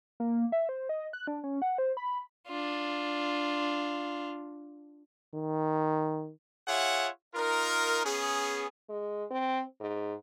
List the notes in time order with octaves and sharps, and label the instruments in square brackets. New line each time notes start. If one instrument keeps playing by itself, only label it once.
[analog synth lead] A#3
E5
C5
D#5
F#6
D4
C#4
F#5
C5
B5
[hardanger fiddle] D4 F4
[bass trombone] D#3
[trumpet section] F4 G#4 C#5 E5 F#5
D#4 F4 A#4
B3 C#4 G#4
[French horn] G#3
C4
G#2